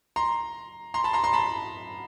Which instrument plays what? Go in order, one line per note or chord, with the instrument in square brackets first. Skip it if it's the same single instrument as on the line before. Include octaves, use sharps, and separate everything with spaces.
[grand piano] A#5 C6
A#5 C6
A5 B5
A#5 C6
A#5 C6
A5 B5